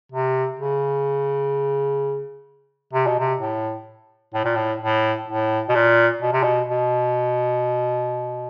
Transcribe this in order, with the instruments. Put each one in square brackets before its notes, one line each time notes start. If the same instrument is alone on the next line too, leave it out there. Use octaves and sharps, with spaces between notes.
[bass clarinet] C3
C#3
C3
B2
C3
A2
A2
A#2
A2
A2
A2
B2
A#2
B2
C3
B2
B2